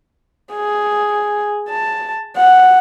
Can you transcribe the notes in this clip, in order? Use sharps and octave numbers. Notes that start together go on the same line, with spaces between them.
G#4
A5
F#5